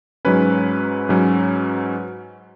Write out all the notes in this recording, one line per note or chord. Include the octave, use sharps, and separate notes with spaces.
G#2 F#3 C#4 B4
G#2 F#3 C#4